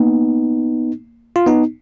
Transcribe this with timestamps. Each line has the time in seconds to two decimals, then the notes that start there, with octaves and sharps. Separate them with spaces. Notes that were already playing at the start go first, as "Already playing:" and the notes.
Already playing: A#3 B3 D#4
1.36 F4
1.46 B3 D#4